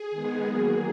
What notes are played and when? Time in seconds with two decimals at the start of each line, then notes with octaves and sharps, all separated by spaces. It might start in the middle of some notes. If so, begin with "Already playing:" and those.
Already playing: G#4
0.11 D#3 G#3 B3
0.45 D#3 F#3 A#3